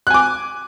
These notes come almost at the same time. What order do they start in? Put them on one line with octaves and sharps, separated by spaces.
F#6 G#5 D6